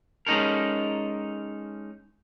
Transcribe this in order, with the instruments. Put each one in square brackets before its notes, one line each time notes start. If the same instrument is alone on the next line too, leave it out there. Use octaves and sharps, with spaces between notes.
[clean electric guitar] G#3 C#4 D#4 A4 A#4